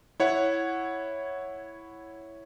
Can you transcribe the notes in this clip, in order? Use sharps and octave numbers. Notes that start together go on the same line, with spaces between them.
E4 C#5 F#5